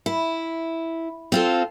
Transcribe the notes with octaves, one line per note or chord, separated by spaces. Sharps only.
E4
C4 F4 A4